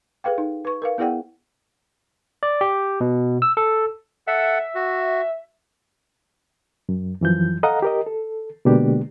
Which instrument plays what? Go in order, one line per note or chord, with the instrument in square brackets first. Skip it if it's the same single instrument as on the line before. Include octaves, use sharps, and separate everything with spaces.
[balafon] G#4 A4 B4 F5 G5
D#4
B4 C#6
A#4 B4 F5
B3 E4 G#4 D5 F#5 G5
[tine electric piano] D5
G4
B2
E6
A4
[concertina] A4 F#5 [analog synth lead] E5
[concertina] F#4
[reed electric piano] F#2
F#2 E3 F3 G6
A4 D#5 F5 F#5 A#5
G4 A#4 D#5
A4
B2 D3 G#3 A#3 D4 G4